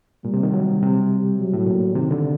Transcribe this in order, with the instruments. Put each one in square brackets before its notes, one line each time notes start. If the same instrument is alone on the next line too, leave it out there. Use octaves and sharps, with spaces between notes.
[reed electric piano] A#2 [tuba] G3
[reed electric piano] C3
D#3
F#3
C3
[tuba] F#3
[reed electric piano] A2
A#2
[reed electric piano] C3 [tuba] D#3
[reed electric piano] D3